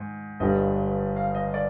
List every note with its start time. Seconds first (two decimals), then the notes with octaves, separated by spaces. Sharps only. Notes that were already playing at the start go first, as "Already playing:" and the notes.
Already playing: G#2 D#3
0.40 G1 G2 D3 G3 D#5
1.16 F5
1.35 D#5
1.54 D5